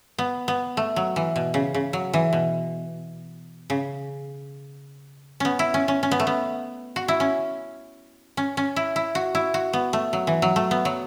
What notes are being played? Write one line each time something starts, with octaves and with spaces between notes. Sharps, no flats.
B3
B3
A3
F#3
E3
B2
C#3
C#3
F#3
E3
B2
C#3
B3 C#4
E4
C#4
C#4
C#4
B3
A3
B3
F#4
E4
C#4
C#4
C#4
E4
E4
F#4
E4
F#4
B3
A3
F#3
E3
F#3
A3
B3
F#3